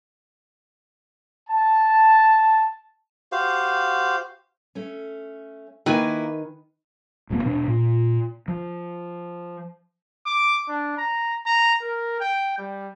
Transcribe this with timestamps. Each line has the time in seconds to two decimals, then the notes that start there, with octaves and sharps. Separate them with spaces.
1.49 A5
3.32 F#4 G4 C5 F5
4.75 A3 C#4
5.86 D#3 A#3 E4 B4 G#5
7.30 D#1 G2 A#3 B3
7.44 E2 B2 D4
7.68 A#2
8.48 F3
10.26 D6
10.68 D4
10.98 A#5
11.46 A#5
11.82 A#4
12.20 G5
12.58 G3